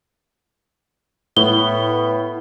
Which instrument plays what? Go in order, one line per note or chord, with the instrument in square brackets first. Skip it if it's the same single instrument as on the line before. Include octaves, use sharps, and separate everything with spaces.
[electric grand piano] A2 [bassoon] B3 [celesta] G7